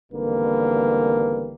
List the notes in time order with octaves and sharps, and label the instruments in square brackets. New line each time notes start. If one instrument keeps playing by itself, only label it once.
[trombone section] G#1 E2 D3 G3 A#3 B4